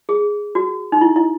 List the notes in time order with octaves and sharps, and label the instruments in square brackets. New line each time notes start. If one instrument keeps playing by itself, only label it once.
[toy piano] G#4
F#4
D#4
E4
E4